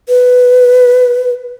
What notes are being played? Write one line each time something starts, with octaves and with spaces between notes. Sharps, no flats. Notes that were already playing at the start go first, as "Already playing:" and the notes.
B4